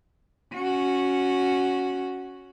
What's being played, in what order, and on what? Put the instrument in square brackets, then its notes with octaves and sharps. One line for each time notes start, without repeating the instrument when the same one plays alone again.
[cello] C#4 F#4